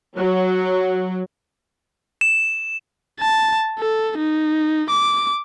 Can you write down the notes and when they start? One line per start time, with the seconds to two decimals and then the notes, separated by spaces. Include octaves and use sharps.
0.17 F#3
2.21 E7
3.20 A5
3.79 A4
4.18 D#4
4.89 D6